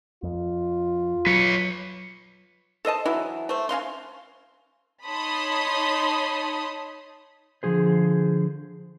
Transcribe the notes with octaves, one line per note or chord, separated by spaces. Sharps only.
F2 F4
F#3 B4 C#5
A4 C5 D#5 A5
E3 F#3 E4
A3 C5
C#4 D#4 F5 C6
D#4 C#5 A5 B5 C6 D#6
D3 F3 F#4 G#4 C5